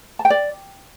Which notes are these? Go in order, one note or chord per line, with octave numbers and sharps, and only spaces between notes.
A5
G5
D5